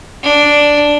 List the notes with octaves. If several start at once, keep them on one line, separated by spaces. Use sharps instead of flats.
D4